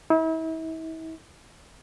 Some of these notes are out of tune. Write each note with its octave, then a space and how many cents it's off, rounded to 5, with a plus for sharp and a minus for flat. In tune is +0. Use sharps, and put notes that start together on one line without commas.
E4 -40